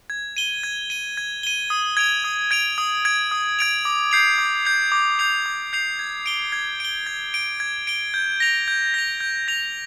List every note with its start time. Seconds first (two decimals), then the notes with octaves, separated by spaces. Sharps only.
0.10 G#6
0.37 D#7 G7
0.63 G#6
0.90 D#7 G7
1.17 G#6
1.43 D#7 G7
1.70 D#6
1.97 G#6 D7 F7
2.24 D#6
2.51 G#6 D7 F7
2.78 D#6
3.05 G#6 D7 F7
3.31 D#6
3.59 G#6 D7 F7
3.85 D6
4.11 G6 C7 F7
4.38 D6
4.65 G6 C7 F7
4.92 D6
5.19 G6 C7 F7
5.46 D6
5.73 G6 C7 F7
5.99 G#6
6.26 D7 G7
6.52 G#6
6.80 D7 G7
7.06 G#6
7.34 D7 G7
7.60 G#6
7.87 D7 G7
8.14 G6
8.40 A#6 F7
8.68 G6
8.94 A#6 F7
9.20 G6
9.48 A#6 F7